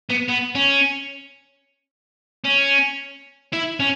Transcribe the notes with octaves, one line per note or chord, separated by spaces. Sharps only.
B3
B3
C#4
C#4
E4
C#4